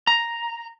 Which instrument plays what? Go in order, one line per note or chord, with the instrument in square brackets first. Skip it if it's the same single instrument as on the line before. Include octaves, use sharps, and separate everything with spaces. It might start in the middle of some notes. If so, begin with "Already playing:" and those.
[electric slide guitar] A#5